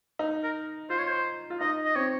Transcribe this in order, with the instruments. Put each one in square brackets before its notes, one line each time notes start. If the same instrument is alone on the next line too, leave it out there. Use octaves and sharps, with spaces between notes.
[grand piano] D#4
[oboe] A#4
[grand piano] F4 [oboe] C5
[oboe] C#5
C5
[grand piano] F4
[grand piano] D#4 [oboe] D#5
[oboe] D#5
[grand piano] C4 [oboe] C#5